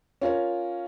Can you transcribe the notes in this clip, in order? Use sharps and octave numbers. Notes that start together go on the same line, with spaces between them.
C#4 F4 A#4 C#5